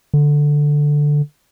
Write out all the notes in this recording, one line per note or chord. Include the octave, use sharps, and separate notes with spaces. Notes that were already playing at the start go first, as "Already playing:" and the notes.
D3